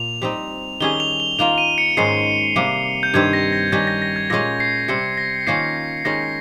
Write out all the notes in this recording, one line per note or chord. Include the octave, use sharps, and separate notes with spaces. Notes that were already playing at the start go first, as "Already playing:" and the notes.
Already playing: A#2 F7
G3 C4 D#4
D#3 G3 C#4 G#4 G7
F7
G7
D#3 A#3 F4 F7
D#7
C#7
G#2 D#3 G#3 C#4 C7
C3 G3 A#3
G6
G2 D#3 G3 C4 G#6
A#6
A#6
D#3 G3 C#4 G#6
A#6
A#6
G#6
A#2 G#3 C#4 A#6
C7
C3 G3 C4 C#7
A#6
D#3 A#3 C#4 F4 C7
D#3 G#3 C#4 A#6